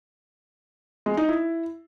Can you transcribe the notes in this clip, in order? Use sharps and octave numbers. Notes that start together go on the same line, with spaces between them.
G#3
D#4
E4